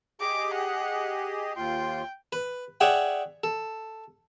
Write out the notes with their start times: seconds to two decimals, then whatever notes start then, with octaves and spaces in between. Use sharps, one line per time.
0.20 G4 G#4 D#5 D6
0.54 F#5
1.56 D#2 F4 G5 C6
2.33 B4
2.81 G#4 C#5 D5 E5 F#5 G5
3.44 A4